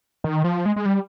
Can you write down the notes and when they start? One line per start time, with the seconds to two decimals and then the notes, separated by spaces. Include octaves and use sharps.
0.24 D#3
0.44 F3
0.66 G#3
0.76 G#3
0.85 G3